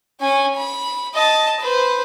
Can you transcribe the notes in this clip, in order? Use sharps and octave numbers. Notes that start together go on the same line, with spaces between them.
C#4 G#5
B5
D#5 A5
B4 C5